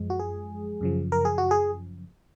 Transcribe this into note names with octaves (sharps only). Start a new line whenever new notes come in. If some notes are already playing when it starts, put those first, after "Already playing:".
Already playing: F#2 F3 G#3
F#4
G#4
F#2 C#3 F3
A#4
G#4
F#4
G#4